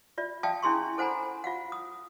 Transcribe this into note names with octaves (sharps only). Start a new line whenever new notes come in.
F4 D5 E5
D5 E5 F5 G5 A5 D#6
C#4 D4 E4 G#4 C6 C#6
A4 C5 F#5 G#5 A#5 B5
F4 F5 F#5
D#6